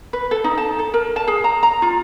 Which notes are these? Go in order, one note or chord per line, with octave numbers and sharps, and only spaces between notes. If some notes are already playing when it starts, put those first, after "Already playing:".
B4
A4
D#4
A5
A4
A#4
A5
G#4
A#5
A#5
F4